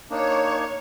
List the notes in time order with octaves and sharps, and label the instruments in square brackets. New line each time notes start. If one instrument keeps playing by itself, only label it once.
[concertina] A#3 D4 D#4 [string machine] C#5